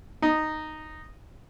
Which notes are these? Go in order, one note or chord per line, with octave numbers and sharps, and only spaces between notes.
D#4